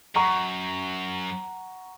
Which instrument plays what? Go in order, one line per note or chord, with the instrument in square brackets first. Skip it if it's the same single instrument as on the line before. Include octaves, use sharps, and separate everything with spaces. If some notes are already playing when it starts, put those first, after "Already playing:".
[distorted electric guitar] F#2 [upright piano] F#5 A#5 C#6